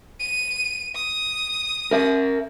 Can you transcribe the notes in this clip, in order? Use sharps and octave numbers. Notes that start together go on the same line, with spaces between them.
D#7
D#6
A#4 E5